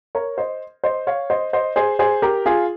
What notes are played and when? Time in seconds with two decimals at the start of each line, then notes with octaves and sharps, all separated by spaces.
0.15 A#4 C#5
0.38 C5 D#5
0.84 C5 D#5
1.07 C#5 F5
1.30 C5 D#5
1.53 C5 D#5
1.76 G#4 C5
1.99 G#4 C5
2.22 G4 A#4
2.46 F4 G#4